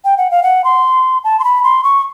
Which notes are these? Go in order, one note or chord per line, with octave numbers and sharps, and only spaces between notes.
G5
F#5
F5
F#5
C6
A5
C6
B5
C6
C#6